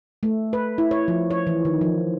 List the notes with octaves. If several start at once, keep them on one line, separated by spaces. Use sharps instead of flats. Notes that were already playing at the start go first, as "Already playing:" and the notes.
A3
B4
E4
C#5
F3
C#5
E3
D#3
F3